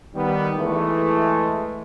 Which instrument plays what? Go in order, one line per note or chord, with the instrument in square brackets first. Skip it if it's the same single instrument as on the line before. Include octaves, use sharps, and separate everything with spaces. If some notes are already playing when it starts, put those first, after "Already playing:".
[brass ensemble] D#3 G3 B3
E3 G#3 A3